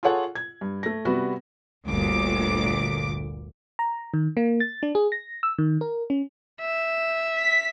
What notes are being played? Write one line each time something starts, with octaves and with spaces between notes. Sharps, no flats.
F4 G#4 A4 C#5 F#5
G#6
G2
A3 A#6
C3 G3 B3 F#4
G1 D2 A#2 D6
A#5
D#3
A#3
A6
D4
G#4
A#6
E6
D#3
A#4
C#4
E5
B6